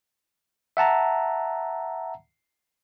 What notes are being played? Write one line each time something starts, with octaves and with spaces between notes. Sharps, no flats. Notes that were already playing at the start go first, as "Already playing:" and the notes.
E5 F#5 A5 A#5